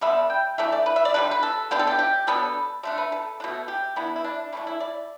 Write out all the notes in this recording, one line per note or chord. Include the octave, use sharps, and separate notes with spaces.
D3 G3 B3 D4 E5
G5
E3 A3 D4 E5
D5
B4
E5
D5
D3 G3 D4 B4
B4
A4
D3 B3 D4 G4
A4
G4
G4
B2 B3 D4 A4
D3 A3 D4 E5
B4
A4
B2 A3 D4
G4
E3 B3 D4 E4
E4
D4
E3 A3 D4 E4
E4
D5